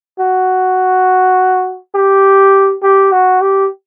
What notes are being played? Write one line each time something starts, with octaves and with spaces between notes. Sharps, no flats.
F#4
G4
G4
F#4
G4